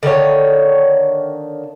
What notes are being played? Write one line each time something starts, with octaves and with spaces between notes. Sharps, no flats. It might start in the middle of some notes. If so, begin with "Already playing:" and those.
D3 D#3 A#3 C#5